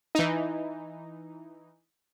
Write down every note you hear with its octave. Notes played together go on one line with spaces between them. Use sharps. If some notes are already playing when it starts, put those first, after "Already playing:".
E3 D#4